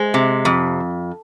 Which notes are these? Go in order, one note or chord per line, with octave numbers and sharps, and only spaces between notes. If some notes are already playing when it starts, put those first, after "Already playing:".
Already playing: G#3 C5
C3
F2